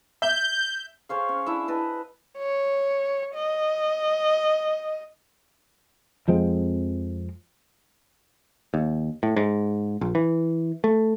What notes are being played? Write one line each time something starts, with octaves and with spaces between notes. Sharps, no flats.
E5 G6
G#4 C5 C#5 F5
C#4
D4 E4 E5
B4 D#5 A5
C#5
D#5
F2 F3 G#3 C4
D#2
A2
G#2
A#1
E3
A3